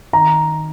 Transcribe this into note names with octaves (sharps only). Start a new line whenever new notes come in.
D#3 A#5